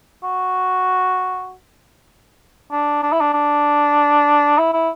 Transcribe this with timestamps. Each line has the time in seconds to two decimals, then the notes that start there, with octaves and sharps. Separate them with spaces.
0.23 F#4
2.72 D4
3.03 D4
3.12 E4
3.21 D4
3.33 D4
4.58 E4
4.73 E4